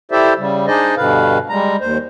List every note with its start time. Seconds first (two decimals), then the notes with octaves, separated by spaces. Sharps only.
0.11 E4 G4 A4 C5 D5 E5
0.38 C#3 G3
0.67 D4 D#4 G#4 C5 D5 D#5
0.97 G2 B2 D3 B4 F5
1.49 G3 G#3 A#5
1.81 D#2 C5